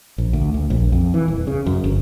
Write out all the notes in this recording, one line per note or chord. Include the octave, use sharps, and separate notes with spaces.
A#1
D2
D2
A#1
F2
E3
D#1
C#3
F#2
G1